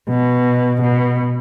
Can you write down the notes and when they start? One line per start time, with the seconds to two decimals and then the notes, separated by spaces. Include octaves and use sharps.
0.09 B2
0.82 B2